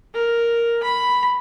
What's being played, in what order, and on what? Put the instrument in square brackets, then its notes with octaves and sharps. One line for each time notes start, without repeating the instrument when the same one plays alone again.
[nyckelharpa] A#4
B5